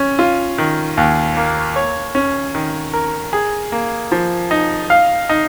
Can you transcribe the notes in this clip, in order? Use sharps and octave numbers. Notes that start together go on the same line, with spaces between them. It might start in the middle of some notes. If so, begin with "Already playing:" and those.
Already playing: C#4
F4
D#3
D#2
A#3
C#5
C#4
D#3
A#4
G#4
A#3
F3
D#4
F5
D#4